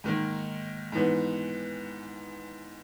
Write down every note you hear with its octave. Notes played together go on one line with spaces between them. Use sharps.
G#2 D#3 A#3
G#2 E3 B3